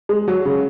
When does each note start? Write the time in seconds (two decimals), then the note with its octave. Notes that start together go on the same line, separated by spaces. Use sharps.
0.09 G#3
0.28 F#3
0.45 C#3